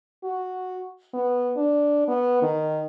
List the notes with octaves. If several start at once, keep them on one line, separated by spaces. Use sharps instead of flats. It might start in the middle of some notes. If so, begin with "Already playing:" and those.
F#4
B3
D4
B3
D#3